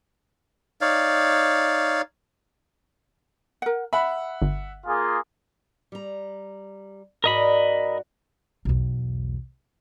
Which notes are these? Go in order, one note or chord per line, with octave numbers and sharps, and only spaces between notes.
D#4 C#5 D5 F5
A#4 F#5
E5 F#5 B5
G1
A#3 F4 G#4
G3 A#5
G#2 F#4 A#4 D5 D#5 B5
B1 E2